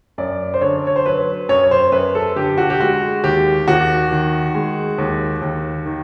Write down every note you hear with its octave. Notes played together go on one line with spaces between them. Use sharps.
F#2 D5
C5
D3 C#5
C#5
C5
F#3 B4
F#2 C#5
C#5
C5
F#2 B4
A4
D3 G4
F#4
G4
G#3 F#4
D#2 G4
D#2 F#4
D#3
G#3
D#2
D#2
D#3